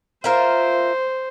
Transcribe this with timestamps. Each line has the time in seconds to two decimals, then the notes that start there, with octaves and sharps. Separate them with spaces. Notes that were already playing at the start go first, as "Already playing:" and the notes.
0.24 F4 A#4 C5 E5